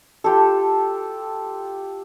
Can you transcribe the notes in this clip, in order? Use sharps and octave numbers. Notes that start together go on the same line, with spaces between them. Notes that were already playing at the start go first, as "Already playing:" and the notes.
F4 G4 A4